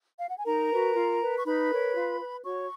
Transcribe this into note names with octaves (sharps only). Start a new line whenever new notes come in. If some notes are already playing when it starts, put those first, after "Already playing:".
F5
F#5
G#5
D#4 A#4 A#5
F#4 B4
F4
B4
C#6
D#4 B4 B5
A#4 C#5
F4
B4
F#4 C#5 C#6